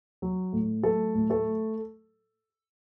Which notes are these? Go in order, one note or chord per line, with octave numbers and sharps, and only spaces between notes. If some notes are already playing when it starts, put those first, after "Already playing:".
F#3
A2
F#3 A3 A4
A2
A3 A4